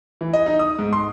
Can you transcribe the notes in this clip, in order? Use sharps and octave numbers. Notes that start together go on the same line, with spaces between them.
E3
D#5
D#4
D#6
G#2
C6